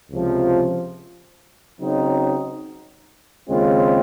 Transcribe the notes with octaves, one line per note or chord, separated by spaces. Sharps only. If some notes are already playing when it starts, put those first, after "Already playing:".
C#2 C3 F3
C#3 F#3 C4 D#4
D#2 C#3 G#3 C4 F4